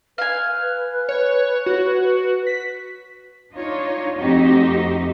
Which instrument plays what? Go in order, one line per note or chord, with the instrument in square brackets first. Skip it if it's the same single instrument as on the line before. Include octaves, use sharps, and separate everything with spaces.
[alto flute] B4 [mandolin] F5 G#5
[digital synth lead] C#5
F#4
B6
[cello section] D4 D#4 F4 C#5
F2 A3 C4 D#4 F#4 G4